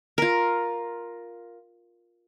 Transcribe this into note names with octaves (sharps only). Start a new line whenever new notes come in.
F4 A#4